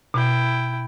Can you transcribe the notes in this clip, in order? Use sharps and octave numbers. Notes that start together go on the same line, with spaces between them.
B2 E4 G5